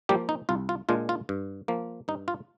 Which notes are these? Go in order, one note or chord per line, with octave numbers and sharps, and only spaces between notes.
F3 G3 A#3 G4
D#4
C2 F4
F4
A#2 G#3 D4 F4
F4
G2
F3 A#3
G2 D#4
F4